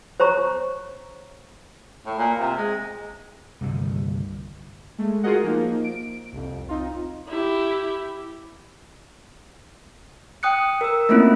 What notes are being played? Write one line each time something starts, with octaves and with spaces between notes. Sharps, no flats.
C5 C#5 A#5 C#6
A2
A#2
C3
G#3
C2 G2 D3 D#3
G#3 A3
F4 F#4 G#4 A#4 D#5 F#5
F3 A#3 D#4
D7
C2 F2
C4 D#4 F4
E4 G4
G5 D#6 F#6 C#7
A#4 E6
A3 A#3 C4 C#4 E4 F4